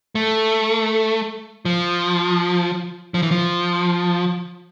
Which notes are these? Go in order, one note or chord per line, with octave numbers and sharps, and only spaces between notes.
A3
F3
F3
E3
F3